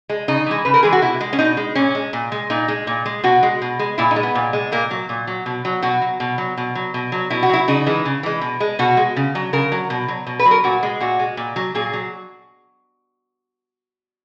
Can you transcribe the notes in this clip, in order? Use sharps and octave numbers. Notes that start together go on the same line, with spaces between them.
G#3
C#3 D#4
E3 G#3
C#3 B4
A#4
E3 G#3 G#4
F#4
B2 E4
G#3
C#4
B2 D#4
G#3
A#2 C#4
G#3
A#2
G#3
A#2 D#4
G#3
A#2
G#3
B2 F#4
G#3
B2
G#3
A#2 E4
D#4
G#3
B3
A#2
G#3
A#2 A#3
F#3
A#2
F#3
B2
F#3
B2 F#4
F#3
B2
F#3
B2
F#3
B2
F#3
B2 E4
F#4
F#3 E4
C#3 D#4
E3 G#3
C#3
E3 G#3
B2
G#3
B2 F#4
G#3
C#3
F#3
C#3 A#4
F#3
B2
F#3
B2
B4
F#3
A#4
A#2 F#4
G#3
A#2 F#4
G#3
A#2
F#3
A#2 G#4
F#3